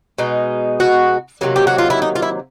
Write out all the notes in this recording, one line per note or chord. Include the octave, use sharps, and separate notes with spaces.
B2 G#3 B3 D#4
F#4
C3 D#3 F#3 A#3
G4
F#4
F4
E4
D#4
F4
E4